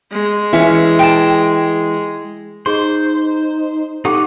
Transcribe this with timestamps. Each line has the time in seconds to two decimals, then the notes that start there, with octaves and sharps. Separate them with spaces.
0.12 G#3
0.53 E3 C#4 E5
0.99 G5 A5
2.66 D#4 G#4 C5 C6
4.05 D#4 G4 A4 F#5 D6